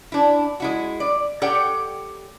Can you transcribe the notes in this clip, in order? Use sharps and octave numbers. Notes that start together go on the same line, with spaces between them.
D4 E4
G#3 E4 F#4
D5
G4 A4 C#5 D5 F#5 G5